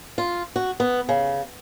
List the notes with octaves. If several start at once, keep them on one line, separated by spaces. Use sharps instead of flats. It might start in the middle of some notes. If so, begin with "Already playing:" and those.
F4
F#4
B3
C#3